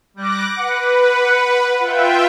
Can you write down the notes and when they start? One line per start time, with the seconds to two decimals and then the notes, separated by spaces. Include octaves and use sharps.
0.17 G3 D6 F#6 A#6
0.58 B4 F#5
1.80 F4 E5 G5